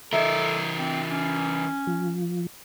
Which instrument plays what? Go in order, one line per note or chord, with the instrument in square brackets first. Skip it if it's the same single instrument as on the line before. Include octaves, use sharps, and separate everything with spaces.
[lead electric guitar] E3 A#4 [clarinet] A4 [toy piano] D#5 E5
[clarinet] C4
C#4
[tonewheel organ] F3